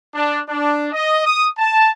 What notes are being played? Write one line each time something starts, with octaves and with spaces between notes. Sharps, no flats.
D4
D4
D#5
D#6
A5